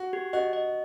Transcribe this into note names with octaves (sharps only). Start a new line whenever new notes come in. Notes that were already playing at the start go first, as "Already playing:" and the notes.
Already playing: F#4
G4
F#4 D#5
D#5